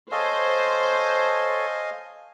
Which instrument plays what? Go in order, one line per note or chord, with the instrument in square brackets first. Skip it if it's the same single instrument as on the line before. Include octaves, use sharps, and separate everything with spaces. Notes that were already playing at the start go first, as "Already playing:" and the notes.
[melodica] A4 C#5 [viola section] C5 [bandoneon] D#5 F5 G#5